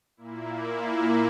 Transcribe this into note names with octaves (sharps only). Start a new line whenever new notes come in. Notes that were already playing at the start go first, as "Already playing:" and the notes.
A#2 A#3 E4